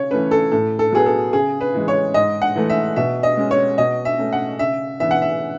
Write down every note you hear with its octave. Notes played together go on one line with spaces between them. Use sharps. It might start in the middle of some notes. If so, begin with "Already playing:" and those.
Already playing: C#3 C#5
E3 A3 C#4 B4
A4
A2 A4
A4
F#3 B3 G#4
A4
C#3 G#4
B4
E3 G#3
C#5
G#2 D#5
F#5
E3 A3
E5
B2 E5
D#5
G#3 C#4
C#5
B2 D#5
E5
A3 C#4
F#5
C#3 E5
E3 B3 E5
F#5
E5